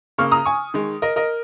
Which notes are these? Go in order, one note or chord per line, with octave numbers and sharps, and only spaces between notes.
C#3 A#3 C#6 F6
A#5 D#6
G#5 C#6
D#3 G#3
A#4 D#5
A#4 D#5